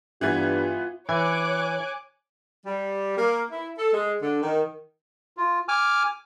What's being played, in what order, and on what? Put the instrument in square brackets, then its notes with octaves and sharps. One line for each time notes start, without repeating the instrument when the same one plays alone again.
[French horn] G2 [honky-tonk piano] E3 B3 G#6 [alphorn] F4
[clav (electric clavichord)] E3 [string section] C#5 D6 F#6 [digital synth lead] G#5
[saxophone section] G3
A#3
E4
A4
G#3
D3
D#3
[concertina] F4
G#5 D6 F6